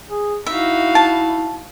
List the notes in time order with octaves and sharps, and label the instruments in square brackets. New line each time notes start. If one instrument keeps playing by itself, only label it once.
[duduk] G#4
[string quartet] D#4 F#4 F5 [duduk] E4 [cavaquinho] E5
[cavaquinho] A5